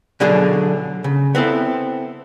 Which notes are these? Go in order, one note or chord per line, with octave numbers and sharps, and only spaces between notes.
B2 D3 F#3 D4 G#4
C#3
B3 C4 E4 A4